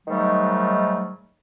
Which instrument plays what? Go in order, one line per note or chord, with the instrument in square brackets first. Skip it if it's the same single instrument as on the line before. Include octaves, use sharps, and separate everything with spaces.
[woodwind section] G#2 D#3 F#3 G3 A3